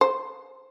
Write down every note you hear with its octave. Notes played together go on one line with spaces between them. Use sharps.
C5